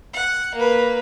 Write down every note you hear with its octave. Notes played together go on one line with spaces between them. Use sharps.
F#5
A#3 B4